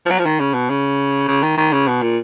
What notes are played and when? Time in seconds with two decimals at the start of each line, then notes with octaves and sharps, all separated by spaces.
0.06 F3
0.10 F#3
0.19 F3
0.26 D#3
0.40 C#3
0.54 B2
0.70 C#3
1.28 C#3
1.43 D#3
1.58 D#3
1.72 C#3
1.88 B2
2.02 A#2